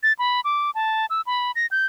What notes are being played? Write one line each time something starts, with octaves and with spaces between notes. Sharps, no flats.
A6
B5
D6
A5
E6
B5
A#6
G6